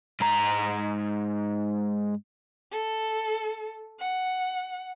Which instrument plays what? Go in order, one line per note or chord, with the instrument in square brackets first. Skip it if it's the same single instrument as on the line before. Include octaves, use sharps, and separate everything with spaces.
[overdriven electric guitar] G#2 A#5
[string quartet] A4
F#5